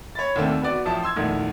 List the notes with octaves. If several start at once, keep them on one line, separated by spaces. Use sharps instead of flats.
C#5 B5 A6
D#2 D3 A3 A#3 C4
B3 F#4 D5
A1 F3 E5 A5
C6 E6 G#6
A#1 E2 D#3 A3